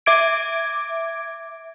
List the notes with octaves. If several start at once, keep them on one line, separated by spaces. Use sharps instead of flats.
E5 D6 G#6 D7